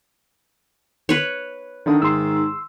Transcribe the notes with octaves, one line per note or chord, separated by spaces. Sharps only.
B4 C#5
D3 D#3 E5 D#6
G#2 C6 E6